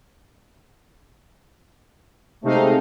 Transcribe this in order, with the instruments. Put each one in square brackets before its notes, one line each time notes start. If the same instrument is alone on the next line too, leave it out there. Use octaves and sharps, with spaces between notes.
[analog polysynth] C3 D#4 F5 [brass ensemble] G#3 A3 C4